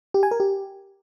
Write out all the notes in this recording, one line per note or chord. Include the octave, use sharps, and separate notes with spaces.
G4
G#5
A#4
G4